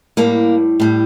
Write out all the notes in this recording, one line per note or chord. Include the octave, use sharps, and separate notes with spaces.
A2 G3 A#3 D4
A2 G3